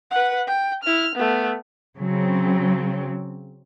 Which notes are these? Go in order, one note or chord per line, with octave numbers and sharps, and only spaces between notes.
B4 F#5
G5
E4 F6
A3 B3
C#3 F#3 C4